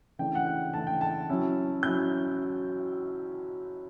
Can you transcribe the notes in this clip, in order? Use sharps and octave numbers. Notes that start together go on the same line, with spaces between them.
C#3 E3 A3 D4 G5
F#5
G5
C#3 E3 A3 D4 A5
G5
A5
F#3 C#4 E4
F#3 C#4 E4 G6